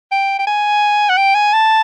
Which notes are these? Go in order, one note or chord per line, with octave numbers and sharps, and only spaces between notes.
G5
G5
G#5
F#5
G5
G#5
A5